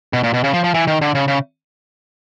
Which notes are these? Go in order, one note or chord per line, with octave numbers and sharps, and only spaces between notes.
B2
A#2
B2
C#3
F3
F3
E3
D#3
D3
C#3
C#3